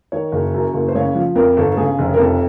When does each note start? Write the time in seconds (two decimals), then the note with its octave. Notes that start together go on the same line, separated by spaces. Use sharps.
0.12 D#3 C#5
0.32 F#1
0.54 F#2
0.74 F#1
0.88 C5
0.95 C#3 C#5
1.15 F3
1.35 F2 A#4
1.57 G1 A4
1.72 A4
1.77 C#3 G#4
1.99 F1
2.14 A#4
2.18 F2 A4